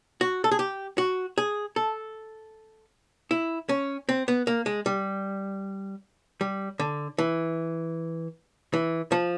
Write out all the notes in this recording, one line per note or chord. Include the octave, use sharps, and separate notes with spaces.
F#4
A4
G#4
G4
F#4
G#4
A4
E4
C#4
C4
B3
A#3
G#3
G3
G3
D3
E3
E3
F3